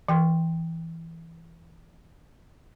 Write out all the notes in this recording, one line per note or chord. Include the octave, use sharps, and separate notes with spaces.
E3 G5 C6